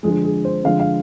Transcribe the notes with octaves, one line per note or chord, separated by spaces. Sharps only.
D3 F3 G#3 G#4
G#4
C5
D3 F3 G#3 F5
F5